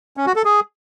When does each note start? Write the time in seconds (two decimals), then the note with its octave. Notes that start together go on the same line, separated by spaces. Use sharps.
0.17 C#4
0.26 F#4
0.36 A4
0.45 G#4